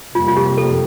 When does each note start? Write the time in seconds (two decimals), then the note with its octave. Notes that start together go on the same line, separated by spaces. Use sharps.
0.15 F2 C3 G3 A#3 F4
0.28 F4
0.37 G4
0.58 A4